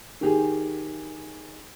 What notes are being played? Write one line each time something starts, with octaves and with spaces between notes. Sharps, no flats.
D#3 G4 G#4